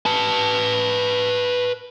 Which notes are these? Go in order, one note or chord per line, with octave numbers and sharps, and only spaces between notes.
B4 A5